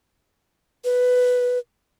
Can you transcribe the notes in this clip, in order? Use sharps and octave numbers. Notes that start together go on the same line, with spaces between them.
B4